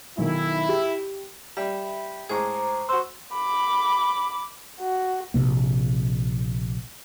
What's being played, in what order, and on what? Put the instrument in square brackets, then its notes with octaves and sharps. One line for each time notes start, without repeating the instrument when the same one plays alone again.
[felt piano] B1 D#3 [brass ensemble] E4
[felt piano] G4
[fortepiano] G3 [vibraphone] E5 B5
[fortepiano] A2 G#3 G#4 [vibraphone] C5 A#5 D6
[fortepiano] F#4 E6 [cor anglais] C5
[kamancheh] B5 D6
F#4
[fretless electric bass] A#1 C3 A#3